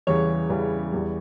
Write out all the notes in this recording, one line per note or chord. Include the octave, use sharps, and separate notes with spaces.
E2 C#3 E3 G3 C#5
E2 C#3 E3 G3
E2 E3 G3